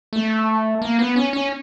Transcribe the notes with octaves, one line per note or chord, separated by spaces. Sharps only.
A3
A#3
B3
C#4
C#4